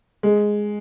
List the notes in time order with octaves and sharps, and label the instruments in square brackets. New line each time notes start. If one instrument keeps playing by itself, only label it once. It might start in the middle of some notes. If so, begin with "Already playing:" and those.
[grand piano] G#3